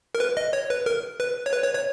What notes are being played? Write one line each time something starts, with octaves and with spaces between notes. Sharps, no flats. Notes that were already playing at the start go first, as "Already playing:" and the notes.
A#4
B4
D#5
C#5
B4
A#4
B4
C#5
B4
C#5
C#5